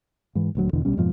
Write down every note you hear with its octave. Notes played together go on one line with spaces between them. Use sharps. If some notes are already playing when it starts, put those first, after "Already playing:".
G#2 E3
D#1 D2 F#3
E2 B2 D3 E3
A#1 B2 G3 C#4
F2 G#2 B2 F3